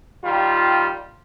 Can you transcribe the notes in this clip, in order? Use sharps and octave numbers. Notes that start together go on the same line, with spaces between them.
D#3 G3 F4